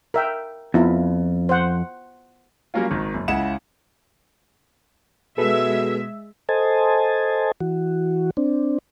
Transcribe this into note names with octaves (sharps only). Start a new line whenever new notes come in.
A#4 E5 G5
F2 B3 E4 F4
C5 F#5
F#3 G3 A#3 C#4 F4
G#1 D#3
F#1
C#2 C#3 E4 F#5 E7
B2 G#3 G#4 A4 B4 E5
A4 C5 D#5 G#5 A5
E3 F#4
C4 D4